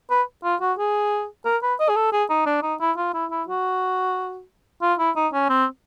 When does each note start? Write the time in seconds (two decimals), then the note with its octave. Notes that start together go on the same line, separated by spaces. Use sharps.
0.10 B4
0.44 F4
0.61 F#4
0.79 G#4
1.45 A#4
1.63 B4
1.80 D#5
1.89 G#4
1.96 A4
2.12 G#4
2.30 D#4
2.46 D4
2.63 D#4
2.80 E4
2.97 F4
3.14 E4
3.31 E4
3.48 F#4
4.82 F4
4.99 E4
5.16 D#4
5.33 C#4
5.49 C4